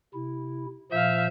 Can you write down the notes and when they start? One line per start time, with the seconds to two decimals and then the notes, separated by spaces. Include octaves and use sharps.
0.14 C3 E4
0.92 A#2 F3 E5 F5 G6